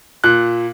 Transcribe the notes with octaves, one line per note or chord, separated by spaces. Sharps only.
A#2 F#6